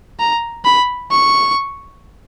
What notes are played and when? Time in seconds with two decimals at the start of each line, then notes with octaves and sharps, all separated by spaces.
0.20 A#5
0.65 B5
1.11 C#6